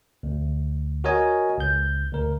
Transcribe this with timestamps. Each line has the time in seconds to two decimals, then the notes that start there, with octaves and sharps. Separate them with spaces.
0.23 D2
1.04 F#4 A#4 C#5 D#5 G#5
1.58 C#2 G6
2.12 D2 A#4